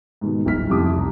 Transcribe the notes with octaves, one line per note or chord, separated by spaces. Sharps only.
G#2 B2 D#3
D1 G1 D#4 F6 B6
F2 C3 E4 G4 D6 D#6
C2 A#5